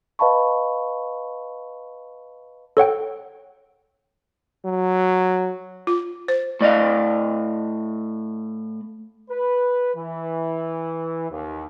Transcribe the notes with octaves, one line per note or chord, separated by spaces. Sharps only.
B4 D#5 F5 A5 B5 C#6
A4 C#5 F#5 G5
F#3
F4
C5
A2 D5 D#5 F5
B4
E3
D#2